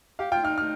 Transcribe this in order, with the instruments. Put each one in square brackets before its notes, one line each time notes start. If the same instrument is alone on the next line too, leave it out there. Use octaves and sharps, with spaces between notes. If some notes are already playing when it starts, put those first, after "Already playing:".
[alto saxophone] G4 [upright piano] F5
[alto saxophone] F4 [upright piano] G5
[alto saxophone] D#4 [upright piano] F6
[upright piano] F6